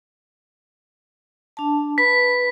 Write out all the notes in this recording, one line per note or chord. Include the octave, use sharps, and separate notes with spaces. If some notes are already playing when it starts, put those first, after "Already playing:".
D4 A5
B4 B5 B6